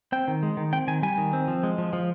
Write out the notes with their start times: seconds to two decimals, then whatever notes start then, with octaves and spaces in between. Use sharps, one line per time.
0.12 C4 G5
0.28 D#3
0.43 G#3
0.57 D#3
0.73 C4 G5
0.88 D#3 G#5
1.03 G3 G#5
1.18 D#3
1.33 C4
1.48 F3
1.63 G#3
1.78 F3
1.93 F3